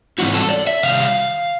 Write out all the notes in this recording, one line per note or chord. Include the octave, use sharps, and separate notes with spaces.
G#2 E3 G3 C4 E4 F#4
A4
D5
E5
C3 D#3 G3 F5